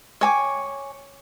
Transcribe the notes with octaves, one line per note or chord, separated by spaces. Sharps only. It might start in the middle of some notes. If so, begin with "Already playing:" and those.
C#5 G#5 D6